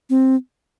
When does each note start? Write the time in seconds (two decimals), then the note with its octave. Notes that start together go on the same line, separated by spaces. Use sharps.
0.10 C4